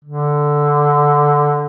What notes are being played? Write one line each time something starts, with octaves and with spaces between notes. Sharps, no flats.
D3